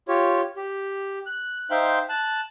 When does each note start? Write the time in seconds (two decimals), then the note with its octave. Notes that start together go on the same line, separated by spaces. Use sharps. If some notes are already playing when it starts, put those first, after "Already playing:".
0.08 F4 G4 C#5
0.56 G4
1.26 F#6
1.71 D#4 C5 E5 F5 G5 C6
2.09 A5 F#6